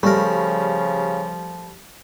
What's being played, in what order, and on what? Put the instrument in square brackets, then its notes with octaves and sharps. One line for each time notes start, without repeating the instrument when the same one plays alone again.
[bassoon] C#3 [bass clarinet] F3 [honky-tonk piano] G3 [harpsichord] A3 A#4